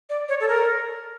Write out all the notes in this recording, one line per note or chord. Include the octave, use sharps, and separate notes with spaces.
D5
C#5
A4
A#4